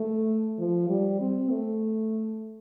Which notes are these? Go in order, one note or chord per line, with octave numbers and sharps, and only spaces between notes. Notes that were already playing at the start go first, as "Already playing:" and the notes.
Already playing: A3
F3
G3
C4
A3